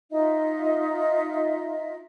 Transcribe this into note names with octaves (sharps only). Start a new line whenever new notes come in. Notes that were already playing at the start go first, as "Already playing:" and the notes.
D#4 F4 D#5 E5